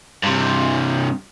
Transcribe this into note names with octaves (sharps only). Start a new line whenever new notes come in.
G2 C3